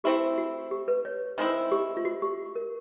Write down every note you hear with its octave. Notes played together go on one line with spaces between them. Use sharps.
A3 C4 E4 G4
F#4
G4
B4
C#5
D#3 G#3 C4 E4 C5
G4
F4
F#4
G4
A#4